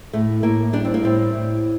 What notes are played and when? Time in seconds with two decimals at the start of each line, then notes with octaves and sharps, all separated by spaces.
0.13 A2 A3
0.43 A2 A#3
0.73 G3 D4
0.85 C4
0.94 A#3
1.04 A2 C4
1.34 A2